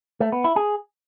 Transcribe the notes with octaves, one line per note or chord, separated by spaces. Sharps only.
A3
B3
E4
G#4